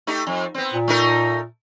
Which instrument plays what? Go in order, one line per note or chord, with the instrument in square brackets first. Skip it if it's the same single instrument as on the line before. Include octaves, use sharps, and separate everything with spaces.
[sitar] A3 D#4 G4
F2
B3 C4
[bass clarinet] A#2
[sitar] A3 D#4 A#4